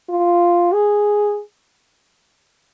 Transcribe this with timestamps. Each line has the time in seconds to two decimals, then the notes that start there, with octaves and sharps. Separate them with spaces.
0.09 F4
0.73 G#4